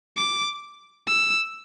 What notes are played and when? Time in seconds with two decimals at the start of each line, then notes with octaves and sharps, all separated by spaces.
0.17 D6
1.07 E6